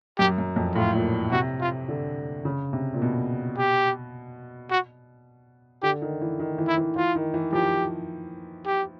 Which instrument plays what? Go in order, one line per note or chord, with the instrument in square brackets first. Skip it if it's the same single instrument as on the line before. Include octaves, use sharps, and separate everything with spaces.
[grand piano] F#2 [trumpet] G4
[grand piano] F#2
F2
[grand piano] A2 [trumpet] F4
[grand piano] A#2
[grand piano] C3 [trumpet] F#4
[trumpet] F4
[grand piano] D3
C#3
C3
A#2
B2
[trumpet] G4
F#4
[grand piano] D3 [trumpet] G4
[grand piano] D#3
E3
D#3
E3
[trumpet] E4
[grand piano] E3
[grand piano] E3 [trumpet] F4
[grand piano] D#3
E3
[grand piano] F3 [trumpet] G4
[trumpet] G4